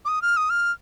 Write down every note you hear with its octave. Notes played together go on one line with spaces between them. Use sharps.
D6
D#6
F6
D#6
F6